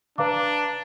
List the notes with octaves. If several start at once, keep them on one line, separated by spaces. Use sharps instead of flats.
D4 B4 F5 A#5 D6